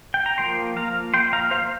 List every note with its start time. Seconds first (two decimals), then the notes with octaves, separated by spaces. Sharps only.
0.14 G5
0.26 A#5
0.38 F3 A#3 G5 C6
0.77 F5 A#5
1.14 G5 C6
1.33 F5 A#5
1.51 C5 F5